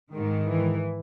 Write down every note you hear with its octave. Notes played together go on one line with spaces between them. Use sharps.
G#2 D#3
E3